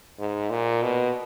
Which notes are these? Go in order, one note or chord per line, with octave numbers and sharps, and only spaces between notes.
G#2
A#2
B2